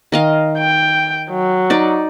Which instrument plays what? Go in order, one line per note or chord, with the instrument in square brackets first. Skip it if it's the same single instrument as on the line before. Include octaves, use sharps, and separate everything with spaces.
[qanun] D#3 D#5 F5
[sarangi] G5
F#3
[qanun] D#4 D5